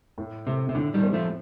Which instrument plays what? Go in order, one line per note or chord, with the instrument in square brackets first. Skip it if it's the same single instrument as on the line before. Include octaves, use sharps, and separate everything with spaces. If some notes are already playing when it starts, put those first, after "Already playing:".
[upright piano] A2
[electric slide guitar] C3 [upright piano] A3
[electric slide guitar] C3
[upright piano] A2 [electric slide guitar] D3
[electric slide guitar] D#3 G3
[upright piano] C4
[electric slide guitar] F3 A3